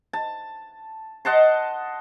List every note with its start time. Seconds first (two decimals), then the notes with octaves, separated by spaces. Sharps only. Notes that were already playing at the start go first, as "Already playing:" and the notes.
0.13 A5
1.25 D#5 F#5 A5 C6